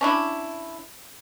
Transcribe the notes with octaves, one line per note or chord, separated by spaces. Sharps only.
C#4 D4 E4